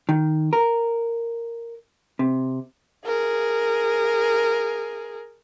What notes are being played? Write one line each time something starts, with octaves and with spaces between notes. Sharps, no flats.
D#3
A#4
C3
G#4 A#4